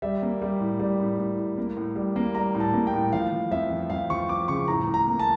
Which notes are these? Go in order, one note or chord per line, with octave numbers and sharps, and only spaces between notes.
G3 E5
A#3
G3
A2
G3
A2
A2
A2
A#3
A2
G3
A#3
G3 A#5
A2
A5
A#3
G5
A2
F3 F5
F3
F2 E5
F3
F2 F5
F3 C#6
F3 D6
C#3 C#6
A2 A#5
A2
A#5
A#3
A5